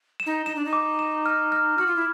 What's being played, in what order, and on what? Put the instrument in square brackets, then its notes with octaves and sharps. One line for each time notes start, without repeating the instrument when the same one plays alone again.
[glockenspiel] E7
[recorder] D#4
[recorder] D#4 [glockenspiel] E7
[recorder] D4
D#4
[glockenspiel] D6
E7
F6
F6
[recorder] F#4 [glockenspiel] F6
[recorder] F4
E4